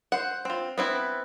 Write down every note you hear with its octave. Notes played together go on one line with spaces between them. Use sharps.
C5 F#5
C4 F4
B3 C4 E4